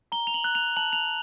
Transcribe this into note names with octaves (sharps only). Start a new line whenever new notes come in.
A#5 G7
F7
F#7
F#6
F7
A5 F#7
F7